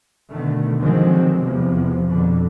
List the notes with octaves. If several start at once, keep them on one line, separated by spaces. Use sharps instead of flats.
B2 D3 D#3 A3
D3 D#3 F3 F#3 G#3 C4
E2 C3 F3
F2 B2 D3